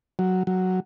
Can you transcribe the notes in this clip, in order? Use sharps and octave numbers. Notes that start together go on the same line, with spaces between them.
F#3
F#3